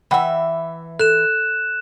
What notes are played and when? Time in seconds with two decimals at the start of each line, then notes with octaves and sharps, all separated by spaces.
0.11 E3 E5 F#5 G5 B5
0.99 A4 F#6 E7